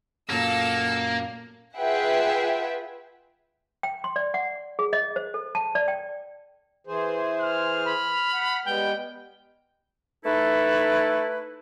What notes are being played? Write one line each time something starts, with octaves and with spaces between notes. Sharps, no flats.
F#2 A#2 A#3 A4 E6
F4 G#4 B4 E5 F#5 G5
G5
C6
D5
F#5
G#4
D#5
C5
A4
A5
D5
G5
E3 G#4 C5
F6
B5
F#5
G3 G#3 B3 G5
A3 D#4 E4 A4 B4